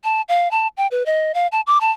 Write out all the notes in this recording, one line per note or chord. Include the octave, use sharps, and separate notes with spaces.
A5
F5
A5
G5
B4
D#5
F5
A5
D6
A5